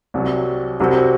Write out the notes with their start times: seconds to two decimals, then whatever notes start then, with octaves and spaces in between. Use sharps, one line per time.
0.14 C2 C3 F#3
0.80 C2 C3 F#3 C4 F#4